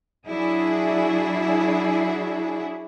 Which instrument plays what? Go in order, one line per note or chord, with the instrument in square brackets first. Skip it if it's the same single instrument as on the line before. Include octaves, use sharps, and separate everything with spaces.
[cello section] F#3 D4 E4 F#4 G#4